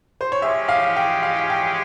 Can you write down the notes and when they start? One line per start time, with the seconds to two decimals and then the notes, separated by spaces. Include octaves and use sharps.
0.21 C5
0.32 C#5
0.42 G#3 C#4 G4 E5
0.69 F5
0.97 G5
1.23 F5
1.50 G5